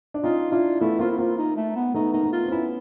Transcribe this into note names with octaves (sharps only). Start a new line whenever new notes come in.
D4
C#4 D#4 F4
D4 E4 F4
A3 B3 E4
A#3 C4 F4
E4
A#3 C4 F4
D#4
A3
B3
A3 B3 D#4
A#3 D#4
A3 B3
F4
C4
B3 C#4 E4